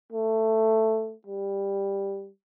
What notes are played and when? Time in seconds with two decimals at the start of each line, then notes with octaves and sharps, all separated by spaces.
0.12 A3
1.27 G3